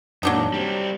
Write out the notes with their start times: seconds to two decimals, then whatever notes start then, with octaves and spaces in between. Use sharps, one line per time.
0.23 F#2 A#2 F#3 D4 D#4
0.53 G3 C4